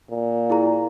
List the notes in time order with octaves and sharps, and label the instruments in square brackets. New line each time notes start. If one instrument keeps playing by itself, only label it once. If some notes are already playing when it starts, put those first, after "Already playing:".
[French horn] A#2
[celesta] E4 G#4 A#5